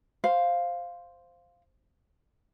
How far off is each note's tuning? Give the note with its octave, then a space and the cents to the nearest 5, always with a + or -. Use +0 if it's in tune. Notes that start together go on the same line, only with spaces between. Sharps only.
C5 +0 F5 +0